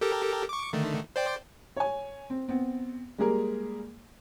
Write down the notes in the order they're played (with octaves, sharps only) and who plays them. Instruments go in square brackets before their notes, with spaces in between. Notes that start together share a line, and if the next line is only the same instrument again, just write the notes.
[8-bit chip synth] G4 A4 A#4
C#6 D6
D3 D#3 A3
C5 D5 G5
[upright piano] C#5 G#5
C4
B3 C4
G3 G#3 A#3 G#4 A#4